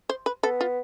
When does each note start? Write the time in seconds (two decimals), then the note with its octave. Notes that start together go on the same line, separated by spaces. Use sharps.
0.09 C5
0.26 B4
0.43 B3 A4
0.61 F4